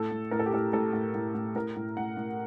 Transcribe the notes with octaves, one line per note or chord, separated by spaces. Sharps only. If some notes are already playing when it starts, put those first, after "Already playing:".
Already playing: A2 A4
A2
A2 A#4
A4
G4
A2 A4
A2 A4
A2
A2
A2
A2 A#4
A2
A2 F#5
A2